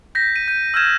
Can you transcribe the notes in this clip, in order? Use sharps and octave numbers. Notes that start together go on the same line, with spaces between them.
G6 A#6 B6
D#7
G6 D#7
E6 F6 G6 G#6 E7